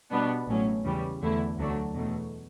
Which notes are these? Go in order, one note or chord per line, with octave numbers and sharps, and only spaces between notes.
B2 G3 B3 D4
A1 A2 F#3 C#4
E2 C#3 E3 G3
E2 D3 A3 E4
D2 D3 F#3 A3 D4
E2 B2 F#3 A3